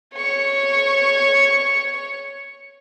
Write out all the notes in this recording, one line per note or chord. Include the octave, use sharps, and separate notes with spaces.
C#5 C#6